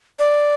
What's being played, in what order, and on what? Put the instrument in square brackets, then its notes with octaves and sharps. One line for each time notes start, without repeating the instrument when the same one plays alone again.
[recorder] D5